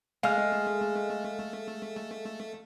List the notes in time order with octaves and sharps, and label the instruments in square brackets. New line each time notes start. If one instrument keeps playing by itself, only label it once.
[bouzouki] G#3 [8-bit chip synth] A3 [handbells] F5 F6